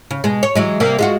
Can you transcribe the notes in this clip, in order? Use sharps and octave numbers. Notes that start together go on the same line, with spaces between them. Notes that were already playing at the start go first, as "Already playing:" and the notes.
C#3
B2 G#3
C#5
E3 F#3 G#3
C3 G3 A#3
G#3 F4 F#4